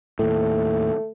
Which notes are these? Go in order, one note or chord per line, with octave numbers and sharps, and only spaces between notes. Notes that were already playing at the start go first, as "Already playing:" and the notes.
D#2 A2 A3